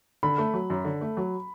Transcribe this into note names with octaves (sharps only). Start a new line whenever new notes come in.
D3 B5
A3
F#3
F#2
D3
A3
F#3